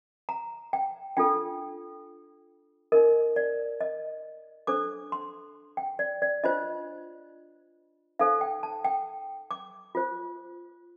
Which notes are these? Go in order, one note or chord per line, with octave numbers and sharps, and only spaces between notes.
A#5
G5
D4 F4 A4 G5
D#4 A#4 D#5
D5
D#5
D4 A4 C5 D6
C6
G5
D5
D5
D4 F4 C5 D#5
D#4 A4 C5 F5
G5
A5
G5
D6
F4 C5